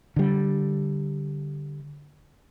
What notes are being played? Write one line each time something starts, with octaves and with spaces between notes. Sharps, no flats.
D3 G3